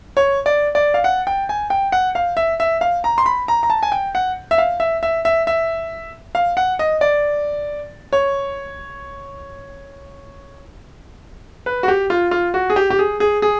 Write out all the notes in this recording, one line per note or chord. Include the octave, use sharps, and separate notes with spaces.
C#5
D5
D5
F5
F#5
G5
G#5
G5
F#5
F5
E5
E5
F5
A#5
C6
B5
A#5
A#5
A5
G#5
G5
F#5
E5
F5
E5
E5
E5
E5
F5
F#5
D#5
D5
C#5
B4
F#4
G4
F4
F4
F#4
G#4
G4
G4
G#4
G#4
G#4